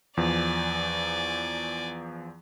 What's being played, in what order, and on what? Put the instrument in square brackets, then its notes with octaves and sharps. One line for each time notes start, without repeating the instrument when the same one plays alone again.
[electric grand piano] E2 F3 [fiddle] D5 G#5